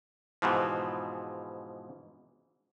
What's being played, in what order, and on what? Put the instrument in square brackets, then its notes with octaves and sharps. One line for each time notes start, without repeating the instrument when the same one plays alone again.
[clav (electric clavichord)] G#2 B2 E3 F3